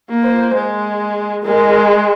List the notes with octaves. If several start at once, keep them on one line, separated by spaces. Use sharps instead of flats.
A#3
C5
G#3
G#3 A#4